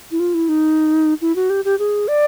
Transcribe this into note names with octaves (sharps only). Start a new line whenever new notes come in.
E4
F4
E4
D#4
E4
F#4
G4
G4
G#4
D5